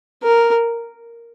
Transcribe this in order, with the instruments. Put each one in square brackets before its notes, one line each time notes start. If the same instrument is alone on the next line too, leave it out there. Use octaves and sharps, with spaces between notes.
[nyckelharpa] A#4